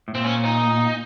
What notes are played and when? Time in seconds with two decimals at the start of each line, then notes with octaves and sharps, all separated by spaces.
0.08 A2
0.15 A#2 C4
0.24 C#4
0.45 D#4